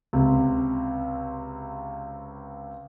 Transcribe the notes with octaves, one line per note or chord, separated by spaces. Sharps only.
C#2 C3